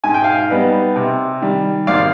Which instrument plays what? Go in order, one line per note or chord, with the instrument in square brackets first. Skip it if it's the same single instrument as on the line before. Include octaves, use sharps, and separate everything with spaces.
[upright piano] G#2 [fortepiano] G#5
[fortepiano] G5
F5 G#5
[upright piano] G3 B3 D#4 B4
C3
D#3 G3
[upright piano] G#1 [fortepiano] D5 F5